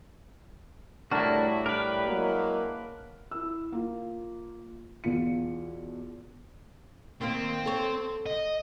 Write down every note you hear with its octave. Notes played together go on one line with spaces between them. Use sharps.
A2 G3 A3 D4 E4 F#4 A#4
D4 A#4 B4
F#3 G#3 A#3 E4
E4 E6
A#3 F4
E2 B2 F4 C#7
D#3 A#3 C4
A4 C#5
D#5